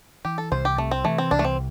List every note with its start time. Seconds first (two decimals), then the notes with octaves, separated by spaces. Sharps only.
0.25 E3 G4
0.38 A4
0.52 C2 C5
0.65 G4
0.78 C3 A3
0.91 C4
1.04 E3 A3
1.18 C4
1.31 C2 D4
1.39 A3
1.44 C4